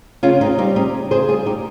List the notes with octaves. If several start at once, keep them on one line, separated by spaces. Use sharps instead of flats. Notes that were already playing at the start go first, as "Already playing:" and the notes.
C#3 C#4 F4
C#3 C4 D#4
G3 C4 D#4
C#3 C4 D#4
C#3
C#3 G#4 C5
G3 F4 G#4
C#3 D#4 G4